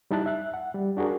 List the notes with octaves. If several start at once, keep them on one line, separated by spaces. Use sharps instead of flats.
G3 D#4 E4 A5 F#6
E5 F#6
F#5
G3
D4 F#4 G#4 A#4